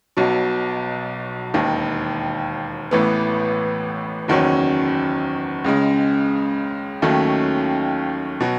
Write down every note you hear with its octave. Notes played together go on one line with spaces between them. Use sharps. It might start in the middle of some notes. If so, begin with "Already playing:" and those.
B1 B2 F#3
E1 D#2 D#3
A1 A2 E3 B3
F#1 E2 D#3 F#3 C#4
C#2 C#3 G#3
D#2 D#3 F#3 A3 C#4
B2 F#3